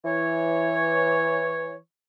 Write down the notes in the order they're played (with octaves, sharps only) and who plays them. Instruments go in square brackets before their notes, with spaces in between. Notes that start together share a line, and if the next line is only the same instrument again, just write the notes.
[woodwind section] E3 C#5